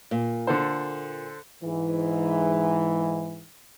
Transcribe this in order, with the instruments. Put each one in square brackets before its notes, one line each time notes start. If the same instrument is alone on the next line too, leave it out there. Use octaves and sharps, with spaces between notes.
[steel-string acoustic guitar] A#2
[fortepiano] D3 A4 C5
[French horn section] G#2 E3